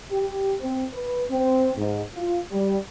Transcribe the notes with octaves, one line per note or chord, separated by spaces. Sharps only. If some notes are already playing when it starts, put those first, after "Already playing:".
G4
C4
B4
C4
G#2
F4
G3